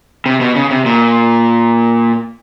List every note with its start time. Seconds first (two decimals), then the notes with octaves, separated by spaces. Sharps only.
0.26 C3
0.41 B2
0.55 C#3
0.71 C3
0.86 A#2